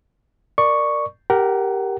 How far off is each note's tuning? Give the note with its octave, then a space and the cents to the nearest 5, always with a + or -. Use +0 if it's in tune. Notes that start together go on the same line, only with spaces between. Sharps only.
A#4 +0 D5 +15 C#6 +0
G4 +0 A#4 +0 F#5 +25